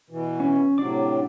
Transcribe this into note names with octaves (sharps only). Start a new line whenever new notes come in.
B2 E3
C#4
A2 C3 F#3 D4 D5 D6